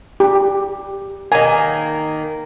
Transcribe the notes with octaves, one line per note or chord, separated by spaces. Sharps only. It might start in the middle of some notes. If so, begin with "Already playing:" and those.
G4
D#3 A#3 G#5